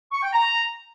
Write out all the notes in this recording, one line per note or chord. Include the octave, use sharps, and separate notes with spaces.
C#6
G5
A#5